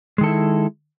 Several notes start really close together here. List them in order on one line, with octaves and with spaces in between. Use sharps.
G#3 D#3 A4 E4